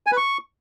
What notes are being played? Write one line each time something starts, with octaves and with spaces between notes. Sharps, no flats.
G#5
B4
C#6